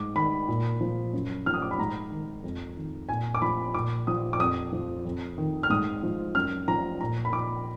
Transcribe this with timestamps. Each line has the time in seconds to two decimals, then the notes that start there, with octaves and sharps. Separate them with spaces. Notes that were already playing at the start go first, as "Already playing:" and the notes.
Already playing: G#2 D6
0.15 D#3 B5
0.48 A#2
0.81 F3
1.13 F#2
1.46 F3 F6
1.54 D#6
1.62 D6
1.71 B5
1.78 G#2 A#5
2.11 D#3
2.44 F2
2.77 D#3
3.09 A#2 G#5
3.35 D6
3.42 F3 B5
3.74 A#2 D6
4.07 F3 D#6
4.33 D6
4.39 F2 D#6
4.73 F3
5.05 F2
5.38 D#3
5.63 F6
5.70 G#2 D#6
6.03 F3
6.35 F#2 F6
6.68 F3 A#5
7.01 A#2 A#5
7.25 B5
7.33 F3 D6